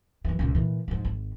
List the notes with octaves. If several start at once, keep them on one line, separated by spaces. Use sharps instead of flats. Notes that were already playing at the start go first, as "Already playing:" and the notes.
F#2 E3
C#2 A#2
A#2 E3
G#2 F3
G#1